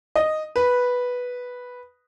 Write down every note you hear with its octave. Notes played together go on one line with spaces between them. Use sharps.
D#5
B4